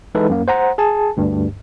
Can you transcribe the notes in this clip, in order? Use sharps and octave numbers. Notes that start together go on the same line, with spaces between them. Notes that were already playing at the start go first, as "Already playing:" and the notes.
E3 G#3 D#4 E4 A4 B4
F#2 A#3
C5 F#5 A#5
G#4 G#5 A5
D2 G2